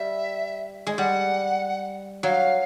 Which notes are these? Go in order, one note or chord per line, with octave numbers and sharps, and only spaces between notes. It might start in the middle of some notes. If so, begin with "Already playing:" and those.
Already playing: G3 E5
G#3
G3 F#5
F#3 F5